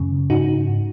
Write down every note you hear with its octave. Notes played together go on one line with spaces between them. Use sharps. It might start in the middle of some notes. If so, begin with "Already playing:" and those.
Already playing: F#2 C#3
G#2 D#4 F#4